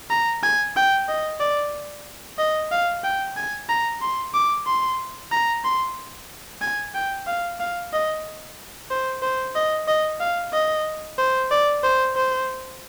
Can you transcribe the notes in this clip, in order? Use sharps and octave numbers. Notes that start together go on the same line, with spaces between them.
A#5
G#5
G5
D#5
D5
D#5
F5
G5
G#5
A#5
C6
D6
C6
A#5
C6
G#5
G5
F5
F5
D#5
C5
C5
D#5
D#5
F5
D#5
C5
D5
C5
C5